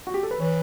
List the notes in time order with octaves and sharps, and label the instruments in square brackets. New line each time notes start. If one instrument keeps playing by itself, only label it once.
[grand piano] F#4
G4
A4
B4
[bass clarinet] E3 [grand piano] C#5